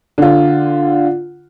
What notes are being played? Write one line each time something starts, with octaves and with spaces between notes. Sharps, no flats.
D3 F4